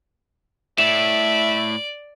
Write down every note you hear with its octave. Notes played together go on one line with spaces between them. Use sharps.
A2 D5 E5 E7